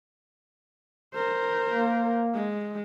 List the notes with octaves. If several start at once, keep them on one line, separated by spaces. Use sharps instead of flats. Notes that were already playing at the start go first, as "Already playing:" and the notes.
A#4 C5
A#3
G#3